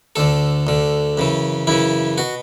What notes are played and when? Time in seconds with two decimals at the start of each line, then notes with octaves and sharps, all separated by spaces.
0.16 D2 D3 A4
0.67 D2 D3
1.18 F#2 C#3 E3
1.67 F#2 C#3 E3 E4
2.18 B2 F#4